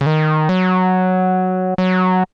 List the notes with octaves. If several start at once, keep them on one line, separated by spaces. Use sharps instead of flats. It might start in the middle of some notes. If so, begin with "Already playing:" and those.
C#3
D#3
F#3
F#3